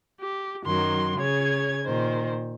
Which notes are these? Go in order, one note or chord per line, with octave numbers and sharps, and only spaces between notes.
G4
F#2 D#3 F#3 C6
C#3 G#4 C#5 G#6
A#2 D#3 C5